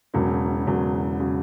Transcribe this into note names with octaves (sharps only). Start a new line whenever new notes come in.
E1 E2 C#3 F#3
E1 E2 C#3 F#3
C#3 F#3